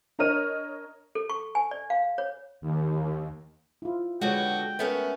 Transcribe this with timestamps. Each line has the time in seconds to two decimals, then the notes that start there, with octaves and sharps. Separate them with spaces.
0.19 D4 A#4 C#5 D#5 F6 D#7
1.15 A4
1.30 C#6
1.55 G#5
1.71 D5
1.90 F5
2.18 C#5
2.61 D#2
3.82 E4 F4
4.21 B2 D3 F#3 G#3 F#4 C#5 G5
4.79 A3 B3 C#4 A#4